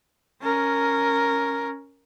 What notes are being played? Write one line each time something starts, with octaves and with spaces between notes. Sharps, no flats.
C#4 A#4